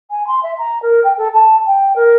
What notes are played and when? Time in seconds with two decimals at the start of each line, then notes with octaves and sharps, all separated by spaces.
0.11 G#5
0.27 C6
0.43 E5
0.58 A#5
0.82 A#4
1.04 G5
1.18 A4
1.34 A5
1.66 G5
1.96 A#4